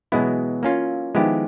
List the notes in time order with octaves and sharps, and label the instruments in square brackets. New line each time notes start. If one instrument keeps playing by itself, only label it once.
[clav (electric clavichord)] B2 G#3 B3 E4 [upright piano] E3 F#3
[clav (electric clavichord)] A#3 C#4 F4
[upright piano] D#3 F3 [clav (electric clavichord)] G#3 B3 E4 G4